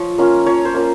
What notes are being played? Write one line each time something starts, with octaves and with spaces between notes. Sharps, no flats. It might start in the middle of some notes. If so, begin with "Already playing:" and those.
Already playing: F3 C#5
A#3 C#4 F4
F3 C#5
C5
A#3 C#4 F4